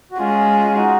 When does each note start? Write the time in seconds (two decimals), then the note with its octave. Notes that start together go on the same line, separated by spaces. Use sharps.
0.12 F#4
0.18 G#3 C#4 F4
0.69 F4
0.76 D#4 F#4